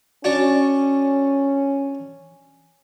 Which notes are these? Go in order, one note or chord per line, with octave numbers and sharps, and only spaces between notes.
C#4 D4 F#4